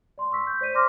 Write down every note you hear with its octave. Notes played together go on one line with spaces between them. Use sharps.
D5 C6
C6 C#6 E6 B6
G6
C5 D5 B6 D#7
D5 C6 D6 F6 A#6